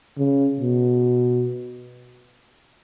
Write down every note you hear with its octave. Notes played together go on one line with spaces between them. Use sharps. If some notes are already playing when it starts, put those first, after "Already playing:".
C#3
B2